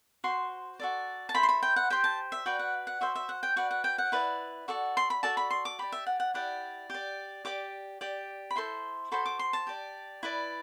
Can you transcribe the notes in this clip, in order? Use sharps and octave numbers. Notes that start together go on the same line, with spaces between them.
F#4 C5 C6
F#4 A4 D5
A5
E4 A4 C5 B5
C6
B5
G5
F#5
G4 C5 G5
A5
E5
F#4 B4 D5 G5
F#5
F#5
F#4 C5 E5
E5
F#5
G5
F#4 B4 D5 F#5
F#5
G5
F#5
E4 B4 D5
F#4 A4 D5
C6
B5
F#4 A4 D5 A5
B5
C6
D6
G4 D5 B5
E5
F#5
F#5
E4 G4 D5 F#5
G4 D5
G4 D5 D6
G4 D5
B5
E4 A4 C5 C6
F#4 A4 C5 B5
D6
C6
A5
G4 D5
E4 B4 D5